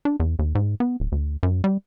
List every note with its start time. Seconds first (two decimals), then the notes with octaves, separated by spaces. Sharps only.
0.05 D4
0.20 E2
0.39 D#2
0.55 G#2
0.80 B3
1.00 D1
1.12 D2
1.43 F#2
1.64 G3